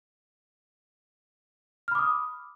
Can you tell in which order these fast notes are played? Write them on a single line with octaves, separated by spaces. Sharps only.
F6 B5 D6 D#6